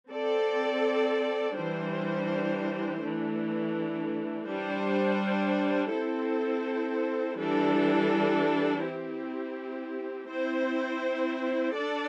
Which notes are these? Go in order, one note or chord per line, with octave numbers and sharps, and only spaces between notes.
C4 A4 D5
E3 G3 D4 C5
E3 A3 D4
G3 D4 C5
C4 E4 A4 C5
E3 G3 D4 A4
C4 E4 G4
C4 E4 C5
D4 A4 D5